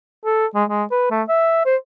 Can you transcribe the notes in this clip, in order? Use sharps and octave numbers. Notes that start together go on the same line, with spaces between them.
A4
G#3
G#3
B4
A3
E5
C5